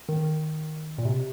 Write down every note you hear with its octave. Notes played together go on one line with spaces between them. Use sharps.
D#3
A#2
C3